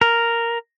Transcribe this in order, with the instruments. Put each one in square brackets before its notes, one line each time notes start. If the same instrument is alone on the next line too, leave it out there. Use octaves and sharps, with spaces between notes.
[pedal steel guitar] A#4